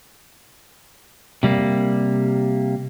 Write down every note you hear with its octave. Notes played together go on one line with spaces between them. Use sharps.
C3 G3 A#3